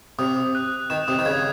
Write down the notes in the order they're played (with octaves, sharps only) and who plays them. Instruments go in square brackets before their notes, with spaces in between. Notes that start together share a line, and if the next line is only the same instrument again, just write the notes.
[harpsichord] C3 [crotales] D#6
[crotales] D#6
F#6
F#6
[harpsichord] D#3 [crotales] E7
[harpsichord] C3 [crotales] D#6
[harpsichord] D#3
[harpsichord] C#3 [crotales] G#6